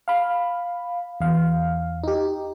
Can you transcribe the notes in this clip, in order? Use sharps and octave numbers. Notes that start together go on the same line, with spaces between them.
F5 B5
E2 F5
D#4 G4